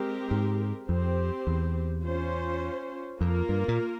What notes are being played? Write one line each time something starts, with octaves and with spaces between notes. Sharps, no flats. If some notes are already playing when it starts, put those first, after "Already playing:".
Already playing: G#3 C4 G4 A#4
G#2
F2 C4 G4 C5
E2
C#4 F4 C5
F2 A#3 F4 A#4
G2
A#2